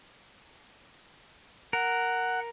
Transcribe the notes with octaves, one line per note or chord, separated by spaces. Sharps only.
A#4 F#5